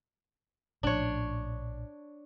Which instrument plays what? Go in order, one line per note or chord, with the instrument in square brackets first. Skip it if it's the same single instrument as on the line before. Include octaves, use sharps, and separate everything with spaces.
[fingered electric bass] A#1 A2 F3 [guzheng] D4 C#5